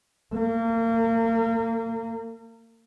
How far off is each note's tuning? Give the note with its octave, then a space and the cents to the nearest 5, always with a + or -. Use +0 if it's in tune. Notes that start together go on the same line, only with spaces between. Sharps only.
A#3 -35